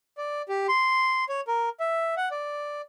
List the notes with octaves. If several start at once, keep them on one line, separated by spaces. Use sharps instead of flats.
D5
G4
C6
C#5
A#4
E5
F#5
D5